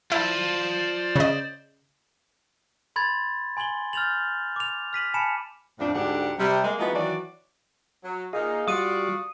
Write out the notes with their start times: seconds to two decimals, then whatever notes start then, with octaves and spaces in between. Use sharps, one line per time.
0.12 E4 F4 C5 D5 A5
1.16 C#3 D#5
2.96 B5 C6 G#6 A6
3.57 G#5 C6 G#6 F#7 G7
3.93 F6 G6 A6 F7 F#7
4.56 D6 F7
4.93 F6 B6 D#7 F#7
5.14 G#5 A5 B5 C#7 E7
5.79 F2 A2 F3 D4
5.94 D2 G#2 D3 D4 G4 F#5
6.39 C3 G3
6.63 G#3 A#3
6.79 F3 G#3 B3 D#4 E4 F#4
6.93 D#3 E3 F#3 F#4 D5
8.04 F#3
8.33 A#2 D#4 G#4 D#5 F5
8.68 G3 F4 F#4 D5 D#6 D#7